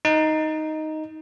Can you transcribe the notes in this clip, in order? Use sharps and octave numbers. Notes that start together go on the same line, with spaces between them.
D#4